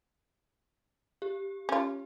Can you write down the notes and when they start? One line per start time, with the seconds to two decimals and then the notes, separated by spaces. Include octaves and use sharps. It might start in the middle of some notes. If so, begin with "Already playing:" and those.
1.22 G4
1.69 C#4 F4